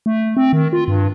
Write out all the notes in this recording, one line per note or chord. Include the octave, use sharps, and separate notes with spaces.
A3
C4
D#3
F4
G2